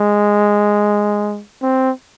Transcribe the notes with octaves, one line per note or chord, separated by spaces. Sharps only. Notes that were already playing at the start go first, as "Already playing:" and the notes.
Already playing: G#3
C4